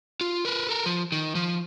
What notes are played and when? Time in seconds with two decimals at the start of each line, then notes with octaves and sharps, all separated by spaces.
0.21 F4
0.45 A#4 B4
0.68 A4 A#4
0.86 F3
1.12 D#3
1.35 F3